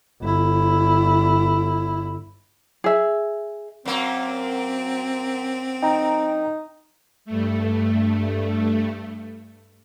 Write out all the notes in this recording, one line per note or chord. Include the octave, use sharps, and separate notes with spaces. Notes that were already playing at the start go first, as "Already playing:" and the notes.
G1 E4
G#4 E5
F#2 A#3 C4
D#4 G5 A#5
G2 A3